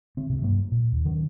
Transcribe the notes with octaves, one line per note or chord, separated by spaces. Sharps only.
D3 C4
D2 C3
G2 F#3 A#3
A#2
D#2
D3 D#3 F#3 C#4